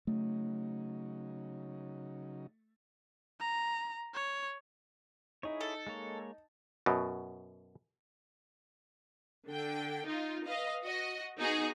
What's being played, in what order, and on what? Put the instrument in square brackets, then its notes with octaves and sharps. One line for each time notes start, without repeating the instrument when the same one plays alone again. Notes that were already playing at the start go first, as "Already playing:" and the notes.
[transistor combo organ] C#3 F#3 D#4 [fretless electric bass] A3
[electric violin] A#5
C#5
[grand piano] D#4 [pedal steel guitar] E4 G#4 C#5
[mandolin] A4
[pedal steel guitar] G#3 A#3 C#5
[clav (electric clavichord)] F#2 B2
[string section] D3 G5
D#4 F4
B4 D#5 F5
F#4 D#5
B3 D#4 F#4 G#4